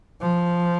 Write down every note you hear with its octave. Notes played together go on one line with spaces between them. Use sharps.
F3